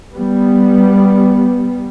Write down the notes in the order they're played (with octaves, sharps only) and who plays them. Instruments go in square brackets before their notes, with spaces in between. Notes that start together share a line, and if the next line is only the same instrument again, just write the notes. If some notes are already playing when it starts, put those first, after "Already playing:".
[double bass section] G3 B3